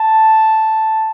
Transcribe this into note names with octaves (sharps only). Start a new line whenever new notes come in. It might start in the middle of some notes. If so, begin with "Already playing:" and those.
Already playing: A5